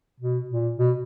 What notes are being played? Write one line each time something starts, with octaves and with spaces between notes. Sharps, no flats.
B2
A#2
B2